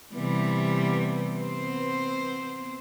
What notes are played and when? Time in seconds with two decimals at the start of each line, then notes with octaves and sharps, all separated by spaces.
0.15 C3 E3 G3 B3
1.37 C4 C5